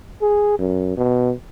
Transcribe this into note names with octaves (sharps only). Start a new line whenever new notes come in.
G#4
F#2
B2